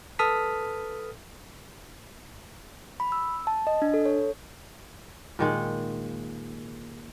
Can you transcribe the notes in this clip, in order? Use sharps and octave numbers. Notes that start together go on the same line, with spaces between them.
A4 B4 A5 D#6 F6 B6
B5
E6
A5
D#5
D4
A4
C#5
A#2 D#3 G#3